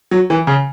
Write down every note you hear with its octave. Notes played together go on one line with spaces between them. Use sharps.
F#3
E3
C#3